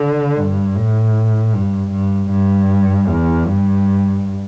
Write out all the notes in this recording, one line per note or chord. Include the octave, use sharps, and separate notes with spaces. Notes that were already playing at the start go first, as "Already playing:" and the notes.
Already playing: D3
G2
A2
G2
G2
G2
E2
G2